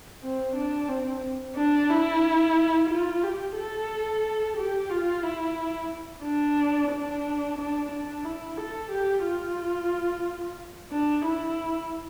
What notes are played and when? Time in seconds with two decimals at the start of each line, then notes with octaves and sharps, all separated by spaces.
0.22 C4
0.55 D4
0.89 C4
1.56 D4
1.89 E4
2.89 F4
3.22 G4
3.56 A4
4.57 G4
4.90 F4
5.23 E4
6.24 D4
6.91 D4
7.58 D4
7.91 D4
8.24 E4
8.57 A4
8.91 G4
9.25 F4
10.91 D4
11.25 E4